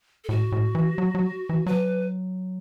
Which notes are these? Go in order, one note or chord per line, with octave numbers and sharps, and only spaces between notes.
A4
A2 F#4
A2
E3
F#3
F#3
E3
F#3 B4